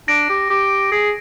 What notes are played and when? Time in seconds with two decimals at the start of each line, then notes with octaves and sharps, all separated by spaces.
0.08 D4 A#6 D7
0.29 G4
0.50 G4
0.92 G#4